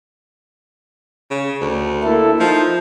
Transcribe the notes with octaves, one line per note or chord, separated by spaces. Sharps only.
C#3
D2
A#3 E4 A4
F3 D#4